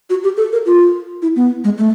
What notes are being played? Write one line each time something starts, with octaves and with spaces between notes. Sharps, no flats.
F#4
G4
A4
A#4
F4
E4
B3
G#3
A3